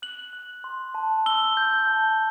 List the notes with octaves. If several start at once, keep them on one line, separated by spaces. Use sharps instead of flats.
F#6 F#7
F#6
C6
A5
E6 G7
G6
A5